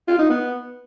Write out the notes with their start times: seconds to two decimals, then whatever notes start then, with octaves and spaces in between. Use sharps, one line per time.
0.08 F4
0.19 D#4
0.29 B3